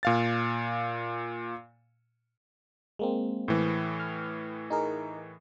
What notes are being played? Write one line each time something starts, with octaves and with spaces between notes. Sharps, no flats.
A#2 F5 A6
G#3 A#3 C4
A2 E3
F6
D#4 G#4 A#4